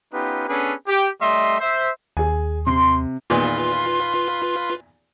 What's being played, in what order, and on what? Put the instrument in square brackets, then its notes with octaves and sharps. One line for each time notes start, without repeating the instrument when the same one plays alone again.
[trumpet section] B3 C#4 D#4 F4 G4 B4
B3 C#4 D4 G#4 A4 B4
G4
G3 A3 D#5 E5 C6
C5 E5
[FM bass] D#2 [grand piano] G#4 G#5
[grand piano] C3 [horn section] C6
[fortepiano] E2 A#2 D#3 [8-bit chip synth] F4 B4 [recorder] C6